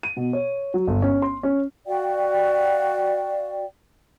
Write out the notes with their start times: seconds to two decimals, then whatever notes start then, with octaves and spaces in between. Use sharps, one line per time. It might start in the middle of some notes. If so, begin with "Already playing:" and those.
0.03 D#7
0.17 B2
0.33 C#5
0.74 F#3
0.87 G1
1.02 C#4
1.22 C6
1.43 C#4
1.86 F#4 D5 F5 G5